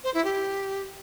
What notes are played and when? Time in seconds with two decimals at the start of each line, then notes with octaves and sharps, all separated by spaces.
0.04 C5
0.14 E4
0.24 G4